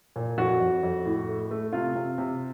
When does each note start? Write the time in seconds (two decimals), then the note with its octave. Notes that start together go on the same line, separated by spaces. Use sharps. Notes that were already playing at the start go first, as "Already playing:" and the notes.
0.16 A#2
0.37 F2 F#4
0.60 F2
0.83 F2
1.05 A2
1.29 A3
1.51 A3
1.73 C3 F4
1.96 C3
2.18 C3